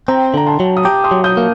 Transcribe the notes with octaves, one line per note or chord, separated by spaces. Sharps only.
C4 G5 A#5
D3 A#5
A5 C6
F#3
D#6
G4 A#5 D6
C6 D#6
F#3
D#6 G6
A#3